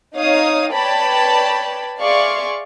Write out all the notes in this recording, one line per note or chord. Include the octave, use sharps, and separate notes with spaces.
D#4 C#5 F5 D#6
B4 C#5 D5 G5 A5 B5
G#4 D5 E5 F5 C6 C#6